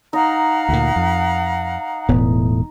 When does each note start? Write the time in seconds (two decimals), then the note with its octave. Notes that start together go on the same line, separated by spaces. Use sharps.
0.13 D#4 F5 F#5 A#5
0.69 D2 A#2
0.96 F2
2.09 E1 A2 B3